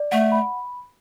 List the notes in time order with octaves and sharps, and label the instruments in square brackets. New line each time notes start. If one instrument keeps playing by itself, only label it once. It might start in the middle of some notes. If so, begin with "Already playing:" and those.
Already playing: [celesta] D5
[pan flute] A3 [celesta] F#5
[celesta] B5